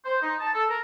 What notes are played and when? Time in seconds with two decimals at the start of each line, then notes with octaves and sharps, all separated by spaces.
0.05 C5
0.22 D#4
0.40 A5
0.54 A4
0.70 A#4